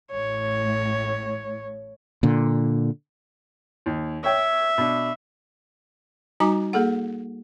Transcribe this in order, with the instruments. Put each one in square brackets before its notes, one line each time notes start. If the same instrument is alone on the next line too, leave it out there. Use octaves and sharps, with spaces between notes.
[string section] A1 A2 [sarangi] C#5
[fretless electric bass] A#2 D3
[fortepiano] D#2
[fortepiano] C#5 G5 [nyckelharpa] E5
[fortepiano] B2 D4
[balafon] G3 D#4 F#4 G#5 A#5 D6
A#3 G#4 A4 F#5